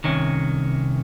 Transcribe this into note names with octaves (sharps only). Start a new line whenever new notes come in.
C2 C3 D#3 C#4